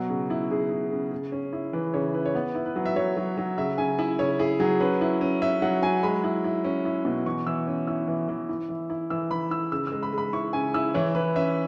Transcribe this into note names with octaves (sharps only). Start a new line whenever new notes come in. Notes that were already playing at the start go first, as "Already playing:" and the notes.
Already playing: B2 F#3
C#3
E4
C#3 G#4
E4
C#3
C#3
C#4
E4
E3 B4
C#3 C#5
E4 B4
C#5
B3 B4
E4
B4
F#3
E5
F#3 C#5
F#3
F#3
C#3 E5
C#3 G#5
E4 E5
C#3 C#5
E4 G#4
F#3 G#4
C#4 B4
E4
C#4
C#4 E5
F#3 F#5
F#3 G#5
G#3 B5
E4
E4
C#4
E4
B2
E3 C#6
E3 E6
C#4
E4 E6
E3
E3
E4
E3
E4
E3 E6
E3 B5
E4 E6
C#3 E6
G#3 E6
B5
G#3
B5
E4 C#6
C#3 G#5
E4 E6
E3 C#5
E3 B4
C#4 E5